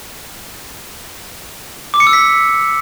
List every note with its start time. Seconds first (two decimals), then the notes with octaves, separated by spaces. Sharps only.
1.94 D6
2.00 C#7
2.07 E6
2.13 B6